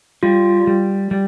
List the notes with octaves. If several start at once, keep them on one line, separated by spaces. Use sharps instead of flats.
G3 F4
G3
G3